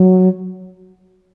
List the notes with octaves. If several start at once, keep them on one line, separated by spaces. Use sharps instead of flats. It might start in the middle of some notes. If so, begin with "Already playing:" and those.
Already playing: F#3